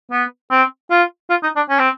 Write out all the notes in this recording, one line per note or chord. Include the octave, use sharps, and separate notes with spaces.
B3
C4
F4
F4
D#4
D4
C#4
C4